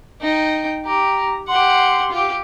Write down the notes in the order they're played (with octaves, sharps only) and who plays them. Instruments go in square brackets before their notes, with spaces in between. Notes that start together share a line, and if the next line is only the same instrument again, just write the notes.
[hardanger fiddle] D#4 G5
[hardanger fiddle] G4 [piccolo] A#5
[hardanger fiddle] G4 F#5 [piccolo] C6
[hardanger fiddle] F4 G4